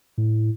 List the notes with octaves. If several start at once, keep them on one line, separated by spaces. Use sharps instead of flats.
A2